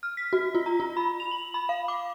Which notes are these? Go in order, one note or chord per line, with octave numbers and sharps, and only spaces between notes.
F6
B6
F#4
F4
A#5
F4
B5
F7
F#7
B5
F5
D6